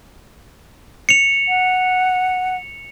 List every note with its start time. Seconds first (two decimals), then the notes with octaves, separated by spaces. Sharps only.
1.09 C#7 F7
1.48 F#5